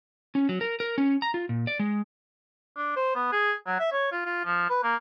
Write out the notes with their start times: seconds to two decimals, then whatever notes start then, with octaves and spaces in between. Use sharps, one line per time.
0.35 C#4
0.49 F#3
0.61 A#4
0.80 A#4
0.98 C#4
1.22 A#5
1.34 F4
1.49 A#2
1.67 D5
1.79 G#3
2.76 D4
2.96 C5
3.15 B3
3.32 G#4
3.67 F#3
3.80 E5
3.92 C#5
4.12 F4
4.25 F4
4.45 F3
4.70 B4
4.83 A#3